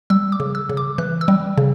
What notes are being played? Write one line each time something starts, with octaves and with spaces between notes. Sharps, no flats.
G3 E6
D6
C#3
E6
C#3
D6
E3 F#6
E6
G3
C#3